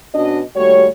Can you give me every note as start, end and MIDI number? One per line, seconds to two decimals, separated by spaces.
0.14 0.41 47
0.14 0.41 61
0.14 0.41 62
0.14 0.41 66
0.14 0.41 75
0.56 0.87 39
0.56 0.87 55
0.56 0.87 57
0.56 0.87 66
0.56 0.87 73